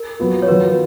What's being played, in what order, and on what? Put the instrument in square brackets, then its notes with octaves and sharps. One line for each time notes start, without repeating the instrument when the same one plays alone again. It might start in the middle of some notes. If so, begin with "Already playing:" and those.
Already playing: [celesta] A#4
[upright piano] F#3 B3 F4
[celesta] C#5
[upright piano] D#3 F#3 B3 F4 [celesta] B4
[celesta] B4